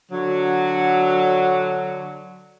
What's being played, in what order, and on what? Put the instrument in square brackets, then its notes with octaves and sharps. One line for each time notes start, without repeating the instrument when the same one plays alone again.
[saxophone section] D3 F#3